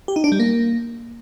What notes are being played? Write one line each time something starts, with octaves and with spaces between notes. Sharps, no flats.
G4
D#4
D4
G3
A#3